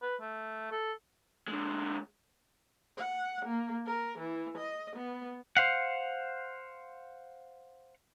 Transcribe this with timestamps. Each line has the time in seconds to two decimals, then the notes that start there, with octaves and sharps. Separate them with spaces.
0.02 B4
0.21 A3
0.72 A4
1.48 D3 G#3
2.97 F#5
3.46 A#3
3.86 A#4
4.18 E3
4.58 D#5
4.96 B3
5.57 C5 F5 F#5